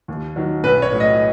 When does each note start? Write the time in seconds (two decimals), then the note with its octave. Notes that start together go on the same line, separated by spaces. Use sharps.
0.08 D#2
0.36 D#3 F#3
0.64 B1 B4
0.82 C#5
0.92 A2 F#3
1.00 D#5